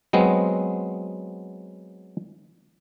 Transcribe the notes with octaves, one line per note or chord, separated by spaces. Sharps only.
F#3 G#3 B3 C4